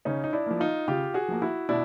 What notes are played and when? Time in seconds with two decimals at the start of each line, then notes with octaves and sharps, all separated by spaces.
0.05 C#3 C#4 D#4
0.24 D#4
0.33 D4 E4
0.46 F3 A#3
0.60 D#4 F4
0.88 C#3 F4 G4
1.14 F#4 G#4
1.28 F3 A#3
1.42 E4 F#4
1.69 B2 D4 E4